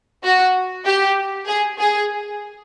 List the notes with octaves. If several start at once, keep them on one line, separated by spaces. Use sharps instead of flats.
F#4
G4
G#4
G#4